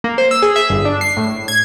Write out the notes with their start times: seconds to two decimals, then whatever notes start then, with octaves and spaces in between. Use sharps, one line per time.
0.04 A#3
0.18 C5
0.31 E6
0.42 G#4
0.56 E5
0.70 G1
0.85 D4
1.01 C7
1.17 A2
1.48 G#6